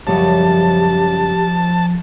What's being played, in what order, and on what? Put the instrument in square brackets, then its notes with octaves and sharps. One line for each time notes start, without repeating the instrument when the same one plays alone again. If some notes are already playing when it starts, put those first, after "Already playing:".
[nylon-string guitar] F#2 C#3 G3 [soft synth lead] F3 [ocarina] G4 [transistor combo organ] A5